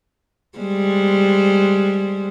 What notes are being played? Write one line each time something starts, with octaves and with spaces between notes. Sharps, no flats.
G3 G#3 C5